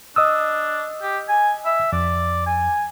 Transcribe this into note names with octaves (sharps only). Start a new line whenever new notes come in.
D4 D#5 D#6 E6
G4
G#5
E5
F2 D5
G#5